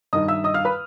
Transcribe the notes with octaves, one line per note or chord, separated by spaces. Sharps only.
G2 D#3 D#5 D#6
E5 E6
D#5 D#6
F5 F6
B4 B5